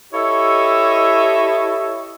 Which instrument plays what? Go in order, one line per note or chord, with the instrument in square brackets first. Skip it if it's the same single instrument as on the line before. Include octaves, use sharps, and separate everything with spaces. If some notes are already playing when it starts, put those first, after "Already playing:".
[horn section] E4 G4 A4 C#5 D#5 E5